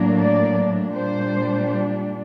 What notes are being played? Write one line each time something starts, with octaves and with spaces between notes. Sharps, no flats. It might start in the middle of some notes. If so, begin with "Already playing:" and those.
Already playing: A2 F#3 A#3 D4
D5
A#2 G3 D4 C5